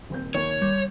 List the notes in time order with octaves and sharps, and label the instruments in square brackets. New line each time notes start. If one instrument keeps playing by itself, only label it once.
[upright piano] D#1 C4 G6
[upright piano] D#2 [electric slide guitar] C#5
[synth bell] G3